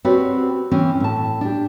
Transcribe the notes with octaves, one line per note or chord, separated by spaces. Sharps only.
C4 F#4 G4 B4 C#5 D5
E3 C4 C#4
A2 A5
D4 G4